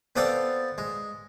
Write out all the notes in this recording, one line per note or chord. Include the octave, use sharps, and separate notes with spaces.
B3 C4 A4 D5 F5 G5
G#3